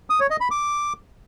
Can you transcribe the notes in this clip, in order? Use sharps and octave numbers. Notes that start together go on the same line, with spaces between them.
D#6
C#5
D#5
B5
D6